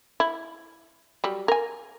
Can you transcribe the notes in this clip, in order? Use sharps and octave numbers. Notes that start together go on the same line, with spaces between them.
E4
F#3 G3
A#4 G#5